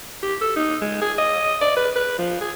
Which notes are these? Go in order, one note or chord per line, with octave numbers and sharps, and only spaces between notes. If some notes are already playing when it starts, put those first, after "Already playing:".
G4
A4
D#4
G#3
G#4
D#5
D5
B4
B4
F3
G#4